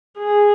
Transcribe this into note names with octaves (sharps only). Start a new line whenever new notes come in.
G#4